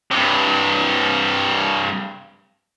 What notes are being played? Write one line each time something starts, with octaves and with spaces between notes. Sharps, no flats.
G2 C3